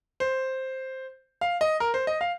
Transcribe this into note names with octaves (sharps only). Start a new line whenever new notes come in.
C5
F5
D#5
A#4
C5
D#5
F5